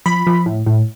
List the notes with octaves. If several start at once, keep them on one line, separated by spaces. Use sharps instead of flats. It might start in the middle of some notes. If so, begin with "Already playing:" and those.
F3 B5
F3
A2
A2